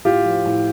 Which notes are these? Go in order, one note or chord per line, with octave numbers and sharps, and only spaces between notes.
A2 F4 G4
F3
A2